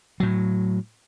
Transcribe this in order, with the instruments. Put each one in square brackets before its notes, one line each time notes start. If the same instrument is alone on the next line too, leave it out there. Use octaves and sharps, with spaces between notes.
[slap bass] A2 F#3